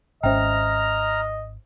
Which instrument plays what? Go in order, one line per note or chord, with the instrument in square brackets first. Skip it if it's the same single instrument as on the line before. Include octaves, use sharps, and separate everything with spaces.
[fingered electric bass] G#1 C#4 [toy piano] C5 E5 G5 [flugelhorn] D#5 [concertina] A#5 F6